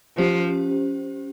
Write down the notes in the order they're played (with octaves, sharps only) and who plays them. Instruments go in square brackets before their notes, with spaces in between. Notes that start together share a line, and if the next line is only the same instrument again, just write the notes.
[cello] F3 [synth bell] C#4 G4 C5